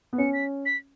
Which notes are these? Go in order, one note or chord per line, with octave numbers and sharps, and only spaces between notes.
B3
C#4 C#7
B6
B6